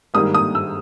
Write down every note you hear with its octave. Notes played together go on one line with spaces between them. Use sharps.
G#2 D#3 G3 A#3 D#6
D#6
E6